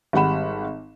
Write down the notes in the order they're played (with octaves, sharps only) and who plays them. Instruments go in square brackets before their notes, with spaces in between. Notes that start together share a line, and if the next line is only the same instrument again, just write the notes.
[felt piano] G#1 G3 F#5 B5 E7